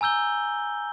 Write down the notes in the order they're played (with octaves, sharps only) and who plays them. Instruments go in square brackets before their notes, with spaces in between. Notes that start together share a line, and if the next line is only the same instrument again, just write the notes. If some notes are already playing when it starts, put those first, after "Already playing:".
[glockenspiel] G#5 A#5 E6 G6 G7